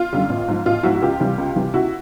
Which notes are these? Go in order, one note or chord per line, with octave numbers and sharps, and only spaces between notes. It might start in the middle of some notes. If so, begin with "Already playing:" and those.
Already playing: F4
F#2 D3 G3
A1
G#2 F3
A1 F4
G#2 F3 E4 F#4
F#4
C#2 F4 G4
C3 E3 G3
C#2
C3 E3 G3
C#2 E4 F#4